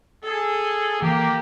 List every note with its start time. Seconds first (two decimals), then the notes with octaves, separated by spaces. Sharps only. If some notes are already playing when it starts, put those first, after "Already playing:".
0.24 G#4 A4
1.02 E3 A#3 G4